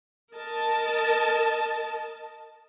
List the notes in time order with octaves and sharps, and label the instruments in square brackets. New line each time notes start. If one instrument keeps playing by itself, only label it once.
[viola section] A#4 D#5 A5